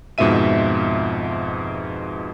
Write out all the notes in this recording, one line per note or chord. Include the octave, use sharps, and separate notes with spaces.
F2 G#2 B2 F4 E5 D#7